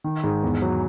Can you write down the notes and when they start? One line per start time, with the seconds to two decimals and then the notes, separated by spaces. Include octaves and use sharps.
0.04 D#3
0.24 G#2
0.43 E2
0.62 F#3